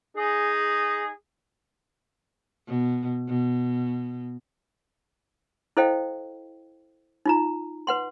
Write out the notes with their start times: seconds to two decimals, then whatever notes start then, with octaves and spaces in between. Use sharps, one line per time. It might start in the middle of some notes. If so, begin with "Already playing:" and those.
0.17 D#4 G#4
2.68 B2
3.28 B2
5.77 E4 A4 C5 D#5 F5 G5
7.26 D#4 F4 A#5
7.87 B4 F#5 C6